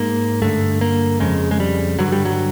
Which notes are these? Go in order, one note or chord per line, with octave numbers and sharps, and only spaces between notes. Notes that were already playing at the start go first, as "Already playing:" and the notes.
Already playing: G#2 A#3
G2 D3 A3
A#3
F2 C#3 G#3
G#3
G3
G2 D3 F#3
G3
F#3